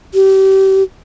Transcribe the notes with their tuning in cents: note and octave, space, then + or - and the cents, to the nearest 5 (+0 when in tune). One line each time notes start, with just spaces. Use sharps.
G4 -30